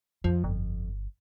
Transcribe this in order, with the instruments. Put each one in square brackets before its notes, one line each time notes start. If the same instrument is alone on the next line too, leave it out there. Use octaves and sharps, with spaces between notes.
[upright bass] F2 [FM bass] F3
[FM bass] G1